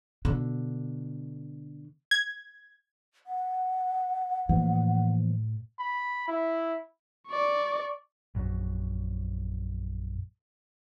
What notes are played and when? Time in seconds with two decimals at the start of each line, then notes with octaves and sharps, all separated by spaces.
0.25 B2 D3
2.11 G#6
3.26 F#5
4.49 A2 E3 F3 A#3
5.79 B5
6.28 E4
7.28 D5 C#6
8.35 A#1 F#2